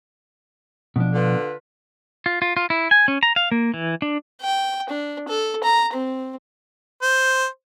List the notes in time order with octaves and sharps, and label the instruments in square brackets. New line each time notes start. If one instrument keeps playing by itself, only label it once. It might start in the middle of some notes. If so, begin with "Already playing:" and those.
[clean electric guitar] B2 F3 D4
[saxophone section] D3 F4 B4
[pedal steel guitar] F4
F4
F4
E4
G#5
C#4
A#5
F5
A#3
E3
D4
[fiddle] G5
D4
A4
A#5
C4
[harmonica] C5